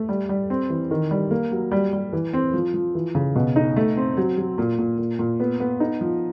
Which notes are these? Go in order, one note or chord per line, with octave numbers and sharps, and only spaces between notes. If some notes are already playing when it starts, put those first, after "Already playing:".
Already playing: A3
G3
G3
C4
E3
D#3
G3
A#3
F#3
G3
G3
E3
C4
F3
F3
E3
C#3
B2
D#4
A3
C4
F#3
F#3
A#2
A#2
A#2
A#2
B3
B3
D#4
F3